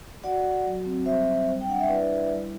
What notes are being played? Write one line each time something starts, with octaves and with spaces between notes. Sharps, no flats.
F#4 D5 F#5
F#4
F#3
C4
G3 C5 E5
C4
G3
G5
D4 F#5
E5
E4 B4 D5
E4
G3